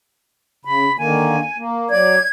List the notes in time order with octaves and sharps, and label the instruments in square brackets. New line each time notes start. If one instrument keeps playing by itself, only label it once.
[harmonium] C#3 [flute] B5
[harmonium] D3 D#3 A#3 [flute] G#5
[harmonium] A#3
[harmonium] F#3 D5 [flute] G#6